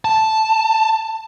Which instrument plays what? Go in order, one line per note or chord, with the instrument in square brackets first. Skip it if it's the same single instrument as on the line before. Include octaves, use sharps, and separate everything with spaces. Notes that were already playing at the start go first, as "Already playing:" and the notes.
[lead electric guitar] A5